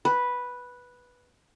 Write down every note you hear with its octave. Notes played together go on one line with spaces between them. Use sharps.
B4